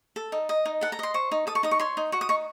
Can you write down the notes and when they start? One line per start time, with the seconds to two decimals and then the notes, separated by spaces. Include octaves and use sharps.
0.16 A4
0.32 D#4
0.49 D#5
0.65 D#4
0.81 A4 F#5
0.92 A#5
0.99 D#5 C6
1.14 C5 C#6
1.32 D#4
1.47 A4 D#6
1.55 C#6
1.63 D#4 D#6
1.71 C#6
1.80 C#5 C6
1.97 D#4
2.12 F#4 C#6
2.21 D#6
2.29 D#4 C#6